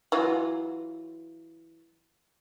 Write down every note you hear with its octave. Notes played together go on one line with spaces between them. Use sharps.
E3 F#3 F4